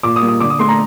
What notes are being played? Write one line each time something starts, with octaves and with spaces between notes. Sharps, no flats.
A#2 D6
D#6
G3 A#3
D#6
D3 D6
D#6
A3 C6
A#5